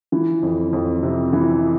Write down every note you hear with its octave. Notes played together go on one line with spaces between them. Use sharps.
E3
F2
F2
C3
E3